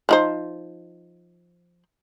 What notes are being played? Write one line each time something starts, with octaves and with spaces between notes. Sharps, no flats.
F3 D#4 C5